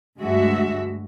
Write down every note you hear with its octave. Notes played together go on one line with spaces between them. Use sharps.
D2 G2 G#3 F#4 E5